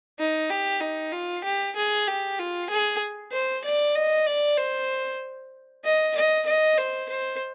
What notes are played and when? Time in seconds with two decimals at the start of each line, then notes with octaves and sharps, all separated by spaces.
0.19 D#4
0.50 G4
0.81 D#4
1.12 F4
1.44 G4
1.76 G#4
2.08 G4
2.39 F4
2.70 G#4
3.32 C5
3.65 D5
3.95 D#5
4.27 D5
4.58 C5
5.84 D#5
6.16 D#5
6.46 D#5
6.78 C5
7.09 C5